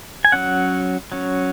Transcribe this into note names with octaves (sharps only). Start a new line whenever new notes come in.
G#5
F#3 C#4 F#5
F#3 C#4